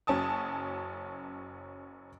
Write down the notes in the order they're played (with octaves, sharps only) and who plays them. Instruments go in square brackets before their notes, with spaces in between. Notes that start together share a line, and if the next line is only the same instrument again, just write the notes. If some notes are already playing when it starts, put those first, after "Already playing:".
[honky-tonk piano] F#1 F#3 C#4 G#5 A5 D#6